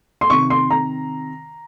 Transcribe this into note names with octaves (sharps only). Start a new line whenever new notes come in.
C6
C3 D#3 C#6
C6
A#5